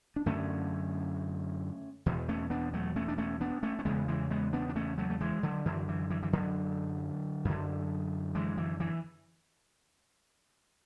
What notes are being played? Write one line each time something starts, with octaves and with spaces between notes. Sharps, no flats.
D4
F#2 D3 A3 C#4
E2 B2
A3 C#4
B3 D4
F#3 A3
A3 C#4
D4
A3 C#4
B3 D4
A3 C#4
C#4
E2 C#3 G#3 B3
E3 G#3
G#3 B3
B3 D4
D4
A3 C#4
F#3 A3
A3
E3 G#3
D3 F#3
F#2 D3 E3
E3
E3
E3
D3 F#3
F#2 D3
E3 G#3
E3
E3